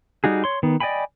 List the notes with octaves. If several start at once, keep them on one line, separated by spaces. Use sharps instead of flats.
G3 D#4 F#4 G#4
C#5 C6
D#3 B3
D5 D#5 G5 G#5 B5